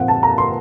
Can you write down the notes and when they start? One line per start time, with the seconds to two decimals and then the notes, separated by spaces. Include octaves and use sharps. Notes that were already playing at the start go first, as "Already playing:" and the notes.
Already playing: A#2 F3 C4 F5 F#5
0.08 A5
0.23 A#5
0.38 C6